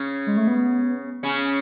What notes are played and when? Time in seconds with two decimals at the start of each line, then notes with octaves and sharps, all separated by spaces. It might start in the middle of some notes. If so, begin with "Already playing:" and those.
Already playing: C#3 C#4
0.27 G#3
0.37 A3
0.48 B3
1.23 C#3 C#4